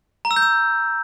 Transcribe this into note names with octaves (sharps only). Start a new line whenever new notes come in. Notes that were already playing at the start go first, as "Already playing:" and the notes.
A#5
E6
G6
E6